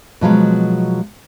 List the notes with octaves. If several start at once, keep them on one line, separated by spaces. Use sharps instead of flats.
B2 F3 F#3 G#3